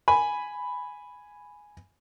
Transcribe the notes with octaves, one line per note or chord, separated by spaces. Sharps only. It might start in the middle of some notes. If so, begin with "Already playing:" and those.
G#5 B5